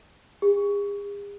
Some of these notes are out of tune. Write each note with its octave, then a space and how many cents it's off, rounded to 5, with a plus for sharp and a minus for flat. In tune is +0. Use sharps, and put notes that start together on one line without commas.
G#4 -45